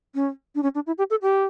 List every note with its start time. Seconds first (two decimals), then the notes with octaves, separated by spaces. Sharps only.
0.15 C#4
0.55 D4
0.63 C#4
0.75 D4
0.87 E4
0.98 G4
1.10 A4
1.22 G4